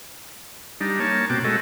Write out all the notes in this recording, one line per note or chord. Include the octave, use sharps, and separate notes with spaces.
G3 D4 D#4
A#3 C#5 A5
B2 A#3 C4 F#4 G5 D6
G#3 A3 F#4 A4 D#5